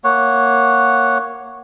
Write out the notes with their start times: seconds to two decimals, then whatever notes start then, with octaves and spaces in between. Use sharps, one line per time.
0.04 A#3 C#5 F#5